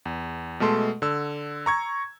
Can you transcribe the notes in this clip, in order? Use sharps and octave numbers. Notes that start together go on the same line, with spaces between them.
E2
B2 G#3 A3 A4 C6
D3 E6
A#5 C#6 G#6